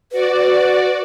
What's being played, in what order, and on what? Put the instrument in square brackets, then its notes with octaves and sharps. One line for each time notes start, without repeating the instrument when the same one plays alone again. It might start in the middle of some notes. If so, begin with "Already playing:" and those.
[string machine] F#4 D5 [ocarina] B4